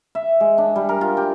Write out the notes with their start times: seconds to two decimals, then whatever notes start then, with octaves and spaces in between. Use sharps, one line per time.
0.15 E5
0.40 G#3
0.58 D4
0.76 G3
0.89 A#4
1.01 F4
1.17 G4